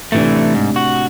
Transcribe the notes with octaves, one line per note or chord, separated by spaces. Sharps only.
A2 C3 E3 A3 D4
G#2
F#4